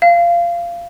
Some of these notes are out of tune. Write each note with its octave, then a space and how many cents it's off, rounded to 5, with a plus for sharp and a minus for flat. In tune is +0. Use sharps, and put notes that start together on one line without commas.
F5 -20